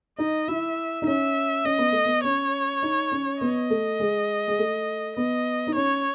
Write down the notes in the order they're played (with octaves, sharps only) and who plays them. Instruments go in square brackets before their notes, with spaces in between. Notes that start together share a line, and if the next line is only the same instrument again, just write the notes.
[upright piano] D#4 [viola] D#5
[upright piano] E4 [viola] E5
[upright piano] D#4
[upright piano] C#4 [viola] E5
[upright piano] C#4 [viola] D#5
[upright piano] B3
A3
B3
[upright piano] C#4 [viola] C#5
[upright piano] D#4
C#4
[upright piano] B3 [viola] D#5
[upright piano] A3
G#3
G#3
A3
[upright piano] B3 [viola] D#5
[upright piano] D#4
[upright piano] C#4 [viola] C#5